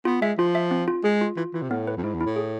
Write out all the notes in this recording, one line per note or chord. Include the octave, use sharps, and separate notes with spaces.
B3 F4
G#3 E5
F3 F4
E5
C4
F4
G#3 G#4
F4
E3 F4
E3 F4
C3
A2 B3
B4
F2
G#2 E4
E2
E4
A2
G#4